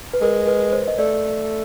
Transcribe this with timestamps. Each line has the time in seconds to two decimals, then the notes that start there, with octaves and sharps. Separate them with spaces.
0.14 B4
0.21 G#3 A#4
0.47 B4
0.72 C5
0.88 D#5
0.98 A3 D5